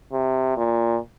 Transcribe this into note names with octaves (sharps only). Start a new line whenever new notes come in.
C3
A#2